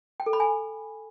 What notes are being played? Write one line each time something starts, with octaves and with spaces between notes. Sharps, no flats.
G5
A4
B5
G#5